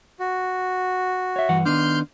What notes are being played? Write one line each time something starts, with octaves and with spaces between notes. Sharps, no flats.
F#4
C#5 E5
G2 E3 F#5
D#3 B3 D4 C6 F6 G6